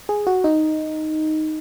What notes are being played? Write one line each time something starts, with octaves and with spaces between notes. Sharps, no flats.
G#4
F#4
D#4